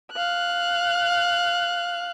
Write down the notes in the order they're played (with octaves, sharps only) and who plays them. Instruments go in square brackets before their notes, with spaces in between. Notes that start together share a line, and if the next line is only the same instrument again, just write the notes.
[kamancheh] F5 F#6